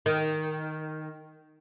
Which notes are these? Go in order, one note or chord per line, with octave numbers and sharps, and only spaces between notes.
D#3